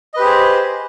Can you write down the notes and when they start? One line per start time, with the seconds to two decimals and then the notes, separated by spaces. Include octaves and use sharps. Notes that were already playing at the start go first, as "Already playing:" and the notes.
0.14 D#5
0.17 B4
0.20 G4
0.22 C5
0.25 G#4